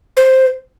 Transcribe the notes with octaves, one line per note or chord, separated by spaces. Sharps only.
C5